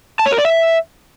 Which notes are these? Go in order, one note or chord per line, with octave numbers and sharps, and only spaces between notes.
A5
C#5
A#4
D5
E5